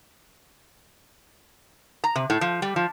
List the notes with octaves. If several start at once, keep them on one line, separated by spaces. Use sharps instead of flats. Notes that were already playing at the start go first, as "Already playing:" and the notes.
A#5
C3
A2
F3
G3
F3